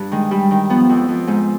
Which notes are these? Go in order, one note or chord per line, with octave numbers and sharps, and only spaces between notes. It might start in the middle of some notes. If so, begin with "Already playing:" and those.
Already playing: G2
D#3 G#3
G3
D#3
F3 B3
F2
F2
G#2 G#3